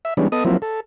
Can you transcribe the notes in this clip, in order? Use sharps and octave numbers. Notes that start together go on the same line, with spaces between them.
E5
E3 G3 G#3 B3 C#4 D4
B3 A4 D#5 D#6
F3 F#3 A#3 C4 E4
A4